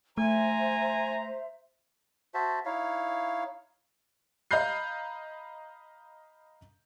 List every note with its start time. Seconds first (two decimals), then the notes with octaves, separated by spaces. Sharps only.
0.18 A3 C5 E5 G#5 A#5
2.34 F#4 C5 E5 A5
2.66 D#4 E4 C#5 F5
4.51 D#5 F5 A#5 B5 G6 C7